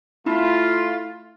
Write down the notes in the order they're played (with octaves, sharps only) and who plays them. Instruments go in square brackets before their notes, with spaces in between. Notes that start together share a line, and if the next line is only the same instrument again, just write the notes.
[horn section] A3 F4 [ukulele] E4